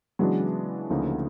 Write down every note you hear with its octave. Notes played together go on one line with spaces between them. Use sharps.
C#3 E3 F#3 G#3 B3 D4
D2 C#3 F3 A#3 D#4